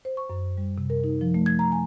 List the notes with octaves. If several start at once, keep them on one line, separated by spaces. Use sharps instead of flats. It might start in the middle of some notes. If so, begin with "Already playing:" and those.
C5
C#6
F#2
G3
C3
A#4
D#4
F3
A3
G#6
A#5
G#5